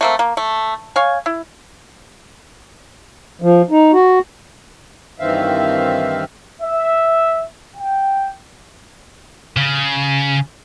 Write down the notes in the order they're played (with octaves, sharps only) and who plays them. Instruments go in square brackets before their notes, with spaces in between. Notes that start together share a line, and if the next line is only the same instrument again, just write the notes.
[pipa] A3 A#3 C4
A#3
A3
C#5 F5 G#5
E4
[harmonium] F3
D#4
F#4
G2 D#3 E3 C4 E5 F5
[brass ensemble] E5
G5
[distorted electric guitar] C#3